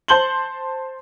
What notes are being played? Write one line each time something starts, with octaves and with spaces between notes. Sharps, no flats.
C5 A5 C6 G6 F#7 G7